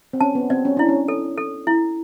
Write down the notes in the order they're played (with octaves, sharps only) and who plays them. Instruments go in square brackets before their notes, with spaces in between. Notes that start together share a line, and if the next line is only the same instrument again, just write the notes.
[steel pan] C4
[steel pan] C#4 [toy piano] A5
[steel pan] B3
[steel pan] C4 [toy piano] D5
[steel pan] C#4
[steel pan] D4 [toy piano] E4
[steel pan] C#4
[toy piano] A4
A4
E4